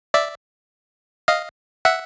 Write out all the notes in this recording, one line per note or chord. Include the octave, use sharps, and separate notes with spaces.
D5 E5
D#5 F5
E5 F#5